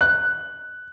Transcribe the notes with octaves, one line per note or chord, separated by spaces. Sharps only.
F#6